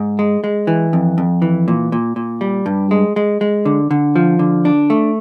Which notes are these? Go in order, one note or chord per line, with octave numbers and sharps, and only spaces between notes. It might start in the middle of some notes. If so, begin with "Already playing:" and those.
Already playing: G#2
G#3
G#3
E3
F2
F2
E3
A#2
A#2
A#2
G3
G2
G#3
G#3
G#3
D3
D3
F3
D3
D4
A3